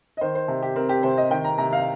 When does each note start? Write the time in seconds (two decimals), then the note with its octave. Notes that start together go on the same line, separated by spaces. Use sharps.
0.17 D#5
0.21 D#3 C5
0.35 C5
0.48 C3
0.62 G4
0.76 C4 A#4
0.89 G4
1.03 C3 C5
1.17 D#5
1.30 D#3 G5
1.44 A#5
1.58 C3 A#5
1.73 F5